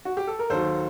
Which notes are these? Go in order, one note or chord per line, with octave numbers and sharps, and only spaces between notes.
F#4
G4
A4
A#4
D#2 D#3 F#3 A4 C5